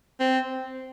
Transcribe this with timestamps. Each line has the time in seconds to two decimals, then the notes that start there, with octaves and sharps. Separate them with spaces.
0.20 C4